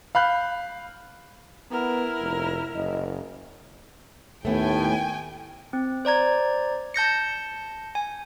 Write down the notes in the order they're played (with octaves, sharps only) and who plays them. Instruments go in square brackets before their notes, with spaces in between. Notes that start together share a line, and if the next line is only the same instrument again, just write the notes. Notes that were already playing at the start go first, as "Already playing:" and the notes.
[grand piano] F5 B5 F#6 G6
[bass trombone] B3 [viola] E4 A#4 [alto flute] A#5
[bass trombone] F1
[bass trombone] F#1 [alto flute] D#5
[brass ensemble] D#2 A2 [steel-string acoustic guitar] A3 B3 [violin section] G5 G#5
[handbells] C4
C5 D5 A#5 G#6
A5 G6 A#6 C#7
G#5